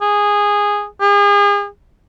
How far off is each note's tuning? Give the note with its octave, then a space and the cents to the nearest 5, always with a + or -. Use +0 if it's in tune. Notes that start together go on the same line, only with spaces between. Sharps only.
G#4 -15
G#4 -40